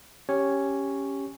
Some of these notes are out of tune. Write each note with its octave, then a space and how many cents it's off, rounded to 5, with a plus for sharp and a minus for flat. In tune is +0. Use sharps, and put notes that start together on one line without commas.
C#4 +0 G4 +0 C#5 +0